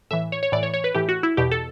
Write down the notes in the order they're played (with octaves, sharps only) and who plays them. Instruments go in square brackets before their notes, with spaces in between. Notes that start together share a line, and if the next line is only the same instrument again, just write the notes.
[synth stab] A2 E3 E5
C#5
C#5
A2 E3 D5
C#5
C#5
B4
A2 E3 G4
F#4
E4
E2 B2 G4
A4